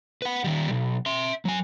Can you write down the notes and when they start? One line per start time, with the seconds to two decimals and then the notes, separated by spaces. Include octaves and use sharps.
0.22 B4 F#5
0.44 D#3 G3
0.70 B1
1.06 E5 C6
1.45 F#3 G#5